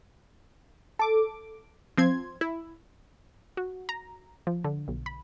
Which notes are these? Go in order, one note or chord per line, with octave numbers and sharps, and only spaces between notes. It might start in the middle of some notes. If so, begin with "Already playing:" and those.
A4 D6
F3 C4 C6 G#6
E4
F#4
A#5
F3
D3
B1
B5